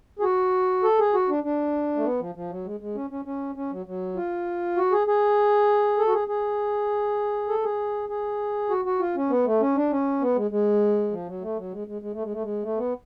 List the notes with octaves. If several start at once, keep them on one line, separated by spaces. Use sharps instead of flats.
G#4
F#4
A4
G#4
F#4
D4
D4
A3
B3
F3
F3
F#3
G#3
G#3
C#4
C#4
C#4
C#4
F#3
F#3
F4
F#4
G#4
G#4
A4
F#4
G#4
G#4
A4
G#4
G#4
F#4
F#4
F4
C#4
B3
A3
C#4
D4
C#4
B3
G#3
G#3
F3
F#3
A3
F#3
G#3
G#3
G#3
A3
G#3
A3
G#3
A3
B3